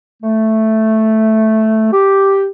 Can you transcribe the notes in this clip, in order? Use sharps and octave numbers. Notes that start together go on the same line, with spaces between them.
A3
G4